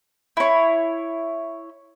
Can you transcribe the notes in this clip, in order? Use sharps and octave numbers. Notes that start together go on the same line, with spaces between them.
E4 C#5